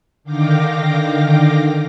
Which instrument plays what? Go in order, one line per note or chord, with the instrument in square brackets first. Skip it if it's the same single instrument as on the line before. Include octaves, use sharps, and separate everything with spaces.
[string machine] D3 D#3 F5 G5 D6 A#6